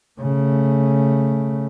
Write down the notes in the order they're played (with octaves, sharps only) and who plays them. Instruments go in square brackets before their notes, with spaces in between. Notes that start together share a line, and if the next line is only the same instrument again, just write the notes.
[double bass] C#3 A3